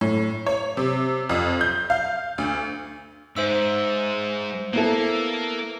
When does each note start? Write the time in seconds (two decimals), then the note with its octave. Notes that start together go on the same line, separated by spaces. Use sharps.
0.01 A2
0.46 C#5
0.77 C3
1.29 F2
1.61 G6
1.90 F5
2.38 D2
3.37 G#2 C5 E5 E6
4.73 A#3 B3 E4 A4